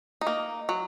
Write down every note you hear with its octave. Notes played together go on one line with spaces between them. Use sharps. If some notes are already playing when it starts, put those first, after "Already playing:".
D#4
A#3
F#3